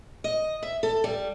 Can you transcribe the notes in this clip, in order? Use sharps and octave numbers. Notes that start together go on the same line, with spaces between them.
D#5
E5
A4
G3